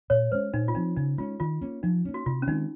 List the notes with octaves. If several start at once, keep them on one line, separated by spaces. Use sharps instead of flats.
A#2 C#5
G#3 C#4 C5
A#2 D#4
F4
F3 C4 D#4
C#3 D#4
G#3 C#4 F4
D#3 F4
A#3 C#4
F3 D#4
A#3 C#4
F#4
C3 F4
C#4
D#3 G#3 C4 D#4